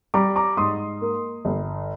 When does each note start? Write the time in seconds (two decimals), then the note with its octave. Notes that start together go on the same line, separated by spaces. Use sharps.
0.14 G3 A#5 D6
0.36 A#5 D6
0.57 G#2 C6 D#6
1.01 A#3
1.45 G1